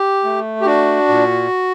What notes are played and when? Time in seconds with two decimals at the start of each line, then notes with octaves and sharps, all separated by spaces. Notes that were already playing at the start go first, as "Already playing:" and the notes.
Already playing: G4
0.24 A3
0.61 G4
0.66 D4 F#4
1.09 A#2